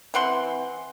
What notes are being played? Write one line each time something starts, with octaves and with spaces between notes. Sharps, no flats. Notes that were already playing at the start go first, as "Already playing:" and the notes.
E3 C4 F#5 C6